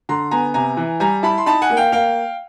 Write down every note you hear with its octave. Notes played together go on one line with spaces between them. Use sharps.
D3 A#5 C6
B3 G#5 A#5
C3 G#5 A#5
E3
G3 G#5 A#5
E4 A5 B5
C6
D#4 A5 B5
F#5 G#5
A#3
F5 G5
A#3 F5 G5